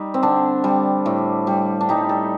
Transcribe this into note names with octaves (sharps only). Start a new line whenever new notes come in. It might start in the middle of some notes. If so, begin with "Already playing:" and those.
Already playing: G3 D#4
C4
D3 D4
G3
A2
G3
D4
G3 D#4
A4